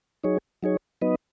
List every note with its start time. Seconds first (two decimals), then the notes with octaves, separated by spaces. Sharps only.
0.24 F#3 D#4 G#4 C#5
0.63 F#3 D#4 G#4 C#5
1.01 F#3 B3 D#4 B4 D#5